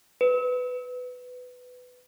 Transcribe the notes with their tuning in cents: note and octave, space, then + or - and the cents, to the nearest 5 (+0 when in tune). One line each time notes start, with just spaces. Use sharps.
B4 +15